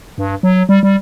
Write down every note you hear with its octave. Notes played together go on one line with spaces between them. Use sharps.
G2
F#3
G3
G3